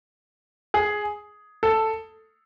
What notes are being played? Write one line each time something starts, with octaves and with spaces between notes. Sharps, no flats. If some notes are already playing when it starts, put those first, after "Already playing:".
G#4
A4